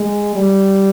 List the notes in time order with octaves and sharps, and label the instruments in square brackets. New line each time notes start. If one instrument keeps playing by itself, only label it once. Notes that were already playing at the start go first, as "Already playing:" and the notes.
Already playing: [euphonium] G#3
G3